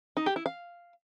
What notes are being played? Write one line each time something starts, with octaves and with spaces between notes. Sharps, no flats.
D#4
G4
E4
F5